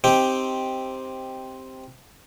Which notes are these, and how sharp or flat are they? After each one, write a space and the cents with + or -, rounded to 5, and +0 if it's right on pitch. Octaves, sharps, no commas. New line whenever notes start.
C4 +0 D#4 +15 G4 +0